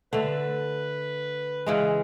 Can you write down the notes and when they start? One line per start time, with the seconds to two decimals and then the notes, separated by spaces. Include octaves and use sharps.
0.13 D3 A3 B4
1.66 C#3 E3 G#3